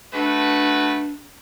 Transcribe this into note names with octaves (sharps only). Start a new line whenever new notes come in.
A3 D4 F#4 B4